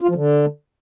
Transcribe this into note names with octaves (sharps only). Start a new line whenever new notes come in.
F4
F3
D3